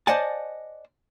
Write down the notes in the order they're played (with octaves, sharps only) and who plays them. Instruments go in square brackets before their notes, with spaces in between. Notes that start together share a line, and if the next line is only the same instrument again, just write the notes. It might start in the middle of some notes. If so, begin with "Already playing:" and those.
[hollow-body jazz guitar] C5 D5 D#5 F#5 G#5 A5